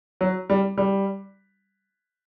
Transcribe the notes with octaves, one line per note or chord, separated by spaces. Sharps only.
F#3
G3
G3